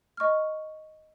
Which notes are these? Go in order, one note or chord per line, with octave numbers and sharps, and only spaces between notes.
D#5 C#6 F6